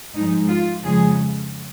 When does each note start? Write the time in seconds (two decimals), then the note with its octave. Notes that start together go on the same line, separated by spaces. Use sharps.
0.14 G#2 F3 G#3 D#4
0.48 F4
0.84 F2 C#3 G#3 G#4